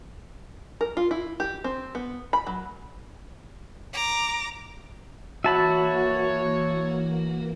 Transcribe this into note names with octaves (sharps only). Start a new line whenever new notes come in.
A#4
F4
E4
G4
C4
B3
B5
F#3
A#5 D6
E3 A#3 F#4 C#5 E5 A5 B5